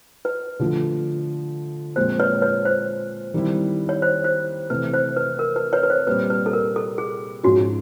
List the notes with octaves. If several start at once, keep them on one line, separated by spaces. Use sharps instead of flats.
B4
D3 F3 A3
A#2 F3 G#3 C4 F4 C5
B4 C#5
B4 C#5
C5
D#3 G3 C4 E4
C#5
C5
C5
C3 E3 A3 B4
C5
B4
A#4
B4
B4 C#5
B4
C5
A#2 G3 C4 B4
B4
A4
A#4
A4
G#4
G#2 F3 G#3 C#4 F4 F#4